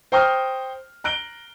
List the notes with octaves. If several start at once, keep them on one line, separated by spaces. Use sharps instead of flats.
C5 G5 A#5 C#6 D#6 F6
A#5 F#6 D7 G7